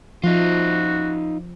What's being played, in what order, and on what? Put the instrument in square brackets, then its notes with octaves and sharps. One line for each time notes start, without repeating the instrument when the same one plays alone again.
[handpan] F3 [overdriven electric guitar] D#4 F4 [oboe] F#4